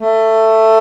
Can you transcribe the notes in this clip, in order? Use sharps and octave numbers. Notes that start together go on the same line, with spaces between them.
A3